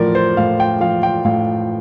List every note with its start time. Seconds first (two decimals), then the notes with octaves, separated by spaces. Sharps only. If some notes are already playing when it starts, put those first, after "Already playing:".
Already playing: A2 F3 A#4 D5
0.15 C5
0.37 A2 F5
0.60 G5
0.80 F3 F5
1.03 G5
1.25 A2 F5